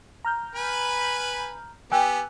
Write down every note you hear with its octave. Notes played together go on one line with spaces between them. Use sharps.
A#5 F6 G6
B4 G#5 B5
B3 G4 G5 G#5 E6 F#6